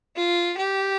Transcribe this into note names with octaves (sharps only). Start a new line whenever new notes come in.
F4
G4